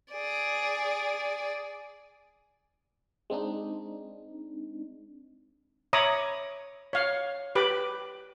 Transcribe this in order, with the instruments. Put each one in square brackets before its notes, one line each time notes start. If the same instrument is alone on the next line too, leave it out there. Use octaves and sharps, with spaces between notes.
[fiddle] G#4 D5
[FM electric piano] G#3 C4 D4 D#4
[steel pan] C#5 E5 A#5 B5 D6 D#6
C#5 F5
G4 B4 B5 D6